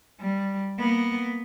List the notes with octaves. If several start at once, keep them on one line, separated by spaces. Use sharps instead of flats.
G3
A#3 B3